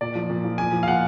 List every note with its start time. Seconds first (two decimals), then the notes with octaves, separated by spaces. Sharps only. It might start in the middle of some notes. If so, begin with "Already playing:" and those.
0.01 A#2 D5
0.15 F3
0.29 A#2
0.44 F3
0.58 A#2 G#5
0.72 F3
0.83 F5
0.88 A#2 F#5